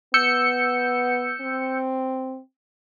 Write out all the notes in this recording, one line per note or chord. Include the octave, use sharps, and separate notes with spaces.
B3 E6 G6 C#7
C4